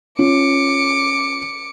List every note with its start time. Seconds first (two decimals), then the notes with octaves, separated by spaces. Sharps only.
0.19 C#4 F4 D6 C#7